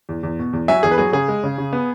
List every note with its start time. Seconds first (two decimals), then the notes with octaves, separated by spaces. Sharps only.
0.09 E2
0.23 E2
0.39 B2
0.53 E2
0.68 F#3 E5 G#5
0.83 E2 G#4
0.91 B4
0.98 F#3 G#4
1.13 C#3 G#4
1.28 G#3
1.43 C#3
1.58 C#3
1.73 B3